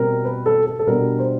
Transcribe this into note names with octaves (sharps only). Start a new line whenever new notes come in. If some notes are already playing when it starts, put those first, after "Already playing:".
Already playing: B2 G3 C4 A#4
B4
A4
A4
A4
B2 G3 B3 D4 A#4
C5